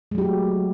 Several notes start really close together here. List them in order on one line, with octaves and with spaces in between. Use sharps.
G#3 F#3 G4 F#4 A3